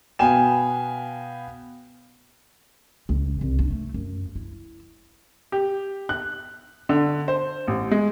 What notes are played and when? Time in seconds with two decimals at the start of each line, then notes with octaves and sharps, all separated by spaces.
0.19 B2 B3 F5 G5 G#5 E7
3.09 C#2
3.41 C2
3.59 D4
3.70 A3
3.94 F#2
4.36 E4
5.52 G4
6.09 F#6
6.89 D3
7.28 C5
7.68 A1
7.91 G#3